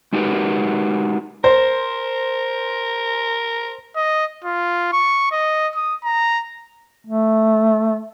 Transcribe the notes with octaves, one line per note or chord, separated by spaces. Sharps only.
G#3 D#4 F#4 G4 A#4 B4
A#4 C5
D#5
F4
C#6
D#5
D#6
A#5
A3